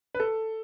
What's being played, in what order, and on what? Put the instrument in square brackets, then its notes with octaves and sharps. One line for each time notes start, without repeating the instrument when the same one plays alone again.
[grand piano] B4
A4